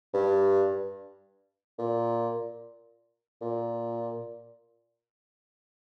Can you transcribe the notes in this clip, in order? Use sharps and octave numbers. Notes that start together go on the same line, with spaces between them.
G2
A#2
A#2